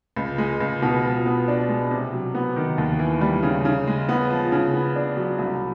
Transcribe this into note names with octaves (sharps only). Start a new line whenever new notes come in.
C#2
G#3
C#2
B2
F3
B3
D4
G#3
C3
F#3
B3
D#3
D#2
E3
G3
C#3
C#3
G#3
B3
F3
C#3
B3
D4
F#3
C2